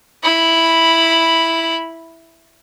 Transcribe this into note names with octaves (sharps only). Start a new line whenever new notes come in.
E4 B5